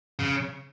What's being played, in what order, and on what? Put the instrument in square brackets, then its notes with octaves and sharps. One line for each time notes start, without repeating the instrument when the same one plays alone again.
[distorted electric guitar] C#3